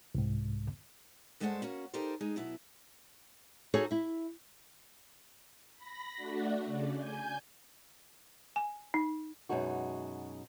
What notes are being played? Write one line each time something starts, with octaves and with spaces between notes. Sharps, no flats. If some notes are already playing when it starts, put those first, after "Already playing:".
C2 G#2
G2 G#3 A3 A4 C5 F#5
A#3 C#4 F#4
D#4 G4 A4 A#4 C5
G#3 D#4 G#4
B2 F#3 E4
D#4 F#4 G#4 A4 C#5
E4 E5
B5 A#6
A3 D4 F#4
C#3 D5
G#5 G6
G#5
D#4
F#2 B2 G#3 D#4 F#4